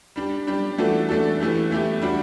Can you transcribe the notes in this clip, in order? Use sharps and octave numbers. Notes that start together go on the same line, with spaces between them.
G3 D4 G4
G3 D4 G4
E3 A3 D4 F#4 A4
E3 A3 D4 F#4 A4
E3 A3 E4 G4
E3 A3 E4 G4
G3 D4 F#4